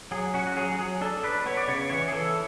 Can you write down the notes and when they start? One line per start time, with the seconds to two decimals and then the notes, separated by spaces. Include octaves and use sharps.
0.11 F#3 G#4
0.34 C#4 F#4
0.47 F#4
0.56 F#3 G#4
0.78 F#3 G#4
1.01 D4 A4
1.23 D4 B4
1.46 B3 C#5
1.57 D5
1.68 C#3 C#5
1.90 E3 C#5
2.08 G#4
2.13 E3 A4